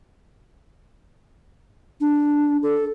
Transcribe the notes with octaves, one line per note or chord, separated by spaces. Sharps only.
D4
A4